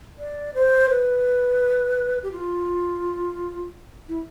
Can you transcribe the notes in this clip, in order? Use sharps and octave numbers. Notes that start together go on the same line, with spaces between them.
D5
C5
B4
G4
F4
E4